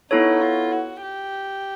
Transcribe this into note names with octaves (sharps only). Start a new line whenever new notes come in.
B3 D#4 E4 A4 C#5
F4
F#4
G4